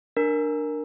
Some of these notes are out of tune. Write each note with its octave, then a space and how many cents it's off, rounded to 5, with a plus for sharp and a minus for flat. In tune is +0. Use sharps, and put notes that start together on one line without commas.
D4 +15 A#4 +0